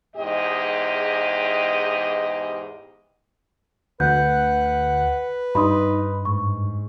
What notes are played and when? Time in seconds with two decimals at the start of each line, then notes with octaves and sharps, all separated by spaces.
0.16 E2 G#2 G4 G#4 D#5
4.00 D2 B4 F#5 G6
5.55 G2 D#4 B5 C6 D#6
6.25 G#2 C#6